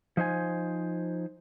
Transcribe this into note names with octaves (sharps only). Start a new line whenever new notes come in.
F3 D#4 C5 G#5